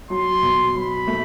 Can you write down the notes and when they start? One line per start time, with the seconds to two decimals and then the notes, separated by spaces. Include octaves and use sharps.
0.10 F#3 C6
0.43 B2
0.75 F#3 B5
1.07 A3